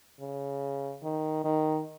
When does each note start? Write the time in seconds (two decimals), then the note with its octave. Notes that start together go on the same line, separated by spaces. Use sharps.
0.20 C#3
1.03 D#3
1.45 D#3